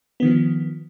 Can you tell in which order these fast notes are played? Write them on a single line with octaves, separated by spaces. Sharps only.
B3 D#3 F3